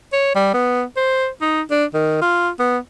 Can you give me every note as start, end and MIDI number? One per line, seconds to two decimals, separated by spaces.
0.13 0.33 73
0.35 0.50 55
0.54 0.84 59
0.97 1.28 72
1.41 1.62 63
1.71 1.85 62
1.94 2.21 51
2.22 2.50 65
2.59 2.78 59